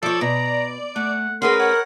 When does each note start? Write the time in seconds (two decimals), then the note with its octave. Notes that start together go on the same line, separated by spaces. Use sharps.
0.03 F3 A4 C#5 D5
0.21 B2 A#5
0.96 A3 F#5
1.42 C#4 G#4 A#4 B4 F#5 C6
1.60 C#5 F#5